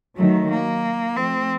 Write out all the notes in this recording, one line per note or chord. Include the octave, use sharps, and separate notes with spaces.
D#3 F#3 A3
A#3
F3 A3 C4